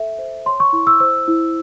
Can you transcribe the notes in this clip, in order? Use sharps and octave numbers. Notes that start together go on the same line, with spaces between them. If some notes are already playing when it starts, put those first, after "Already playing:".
Already playing: A4 E5
C5
C#5 C6
C#6
E4 C#6
E6
C5 E6
E4